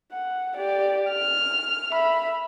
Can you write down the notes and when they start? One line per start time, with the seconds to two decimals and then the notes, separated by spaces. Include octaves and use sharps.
0.12 F#5
0.57 G4 D5
1.10 F6
1.92 E5 B5